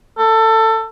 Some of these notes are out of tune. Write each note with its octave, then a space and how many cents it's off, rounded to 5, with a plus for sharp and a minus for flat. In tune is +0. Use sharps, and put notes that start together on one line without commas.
A4 +20